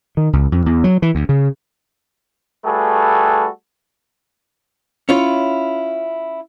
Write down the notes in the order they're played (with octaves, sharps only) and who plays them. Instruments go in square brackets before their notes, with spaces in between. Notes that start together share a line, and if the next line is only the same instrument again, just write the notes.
[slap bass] D#3
C#2
F2
E2
F#3
E3
D2
C#3
[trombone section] G3 A3 F#4 G#4 A4 B4
[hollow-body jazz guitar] C#4 E4 F4 C#5